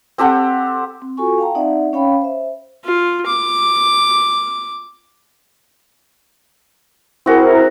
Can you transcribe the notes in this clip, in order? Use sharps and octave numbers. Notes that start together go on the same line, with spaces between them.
C4 G4 A4 F#5
C4
F4 F#4 A4 G#5 C#6
F5 G5 A5 A#5
C4 D#4 D5 E5 F#5
C#4 C#5 F5 G5 B5
C5 E5
F4
D6
C4 E4 F#4 G#4 A#4